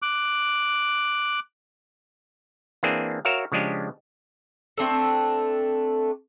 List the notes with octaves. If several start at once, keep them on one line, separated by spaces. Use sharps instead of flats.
D6 F#6
E3 A#3 C4 D4 G#4
F#4 A#4 C#5 E5 F5
C#3 F3 G#3 D4 G4
A3 C4 D4 A4